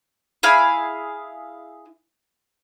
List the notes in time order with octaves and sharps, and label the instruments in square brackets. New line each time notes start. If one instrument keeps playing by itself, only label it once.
[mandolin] E4 G#4 F5 B5